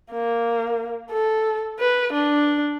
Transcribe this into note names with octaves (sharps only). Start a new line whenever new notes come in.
A#3
A4
B4
D4